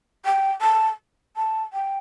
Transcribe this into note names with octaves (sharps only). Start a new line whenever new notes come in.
G5
A5
A5
G5